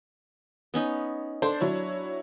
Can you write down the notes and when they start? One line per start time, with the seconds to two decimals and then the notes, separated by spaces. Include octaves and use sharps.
0.74 B3 C#4 D#4
1.42 D4 A4 C5
1.61 F#3 E4 C#5